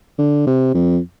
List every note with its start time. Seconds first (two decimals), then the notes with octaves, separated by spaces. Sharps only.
0.19 D3
0.47 C3
0.75 F2